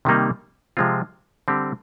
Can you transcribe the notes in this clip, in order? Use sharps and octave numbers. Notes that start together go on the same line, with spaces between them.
C3 D#3 G3 A#3 D#4
C3 F3 G#3 C4 F4
D3 G3 C4 G4